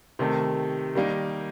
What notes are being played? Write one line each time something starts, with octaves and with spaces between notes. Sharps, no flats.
C3 D#3 A3
D#3 G3 A#3 D#4